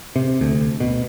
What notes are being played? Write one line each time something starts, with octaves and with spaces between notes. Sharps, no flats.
C3
D2
B2